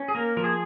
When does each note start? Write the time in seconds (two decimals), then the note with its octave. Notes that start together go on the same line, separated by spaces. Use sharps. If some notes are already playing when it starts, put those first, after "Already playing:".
Already playing: C#4
0.08 G#4
0.15 A#3 A#4
0.37 F3 A#4
0.44 G#4